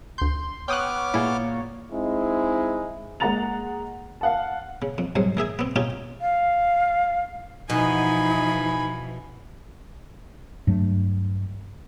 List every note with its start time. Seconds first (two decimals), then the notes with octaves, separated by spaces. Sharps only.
0.18 D2 C6 G6
0.68 B3 C#5 G5 D6 D#6 F6 F#6
1.14 A#2 E4 G#4
1.91 G#3 C4 D#4 E4
3.20 G#3 A#3 F#5 A#5 A6 F7
4.21 F5 F#5 A5
4.82 C#3
4.98 F2
5.15 C2 G#2 F#3 C5
5.37 D#3 G#4 E5 G#5
5.59 B3 C4
5.76 C#4 D#4 F4 G4 G#5
6.21 F5
7.70 B2 E3 F3 D#4 G#5 B5
10.67 G2 F#3 A3